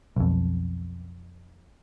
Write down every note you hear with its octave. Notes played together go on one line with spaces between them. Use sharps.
B1 F2